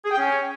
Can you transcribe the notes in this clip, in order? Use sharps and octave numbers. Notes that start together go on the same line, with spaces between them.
G#4
G5
C#4